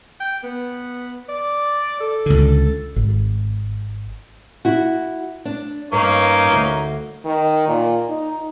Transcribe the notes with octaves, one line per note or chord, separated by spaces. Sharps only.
G5
B3
D5
A4
C#2 D3
G#1
E4 F#4
D4
G2 A#3 C#4 D#4
D2
D#3
A#2
D#4